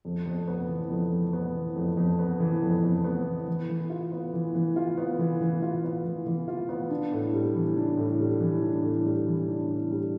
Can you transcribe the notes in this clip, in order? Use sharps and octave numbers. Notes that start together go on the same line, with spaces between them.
F2
F2
B3
E3
F2
F2
B3
E3
F2
F2
B3
E3
F2
F2
B3
E3
E3
E3
F4
B3
E3
E3
F4
B3
E3
E3
F4
B3
E3
E3
F4
B3
D4
A2
G3
E3
D4
A2
G3
E3
D4
A2
G3
E3
D4
A2
G3